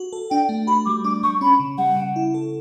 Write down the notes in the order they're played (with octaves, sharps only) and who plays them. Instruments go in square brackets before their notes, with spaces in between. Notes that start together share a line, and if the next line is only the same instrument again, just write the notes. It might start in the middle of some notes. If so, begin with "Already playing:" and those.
Already playing: [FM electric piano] F#4
A4
[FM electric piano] D4 [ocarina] G5
[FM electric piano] A3
[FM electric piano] F#4 [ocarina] B5
[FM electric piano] G3 [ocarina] D6
[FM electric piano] D4 [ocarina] D6
[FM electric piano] G3 [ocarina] C#6
[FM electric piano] C#4 [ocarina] B5
[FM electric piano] C#3
[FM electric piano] G3 [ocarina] F#5
[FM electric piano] C#3
E4
A4